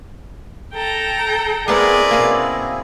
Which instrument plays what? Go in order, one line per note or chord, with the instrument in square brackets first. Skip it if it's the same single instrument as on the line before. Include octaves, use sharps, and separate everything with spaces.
[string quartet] A4 G5 A#5
[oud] G#3 B3 [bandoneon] C4 E4 G#4 [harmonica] A#4 B4 D5
[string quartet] B2 [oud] A#3 C#4